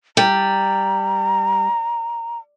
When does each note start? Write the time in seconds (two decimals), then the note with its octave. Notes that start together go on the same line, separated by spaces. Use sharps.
0.17 G3 A#5